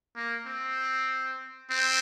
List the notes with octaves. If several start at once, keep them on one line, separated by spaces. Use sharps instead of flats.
A#3
C4
C4